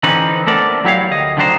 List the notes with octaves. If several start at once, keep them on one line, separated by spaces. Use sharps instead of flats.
D3 E3 C4 C#4 D#4 B4
A3 B3 C4 A4 A#4 D5
F#3 E4 G4 C#5 F5
D2 D#5
D3 D#3 F#3 D4 D#4 C5